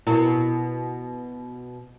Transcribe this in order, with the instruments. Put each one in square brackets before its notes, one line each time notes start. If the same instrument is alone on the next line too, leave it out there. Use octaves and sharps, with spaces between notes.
[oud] B2 [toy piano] E4 A#4